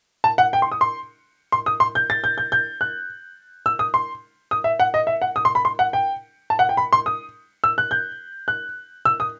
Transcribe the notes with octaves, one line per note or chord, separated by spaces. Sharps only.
A5
F#5
G5
C6
D#6
C6
C6
D#6
C6
G6
A6
G6
G6
G6
F#6
E6
D#6
C6
D#6
E5
F#5
D#5
E5
F#5
D#6
C6
B5
C6
F#5
G5
A5
F#5
G5
B5
C6
D#6
E6
F#6
G6
F#6
E6
D#6